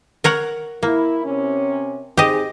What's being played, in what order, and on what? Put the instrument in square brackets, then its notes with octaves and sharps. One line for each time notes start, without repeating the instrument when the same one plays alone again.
[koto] A#4 C#5 F#5
[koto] A#3 [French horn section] E4
[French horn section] C3 C#4
[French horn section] C4 D#4 G#4 [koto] G4 D#5